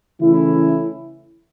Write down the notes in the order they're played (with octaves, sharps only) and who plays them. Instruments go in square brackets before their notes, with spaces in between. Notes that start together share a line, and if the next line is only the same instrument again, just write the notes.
[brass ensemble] C#3 E3 A3 C#4 E4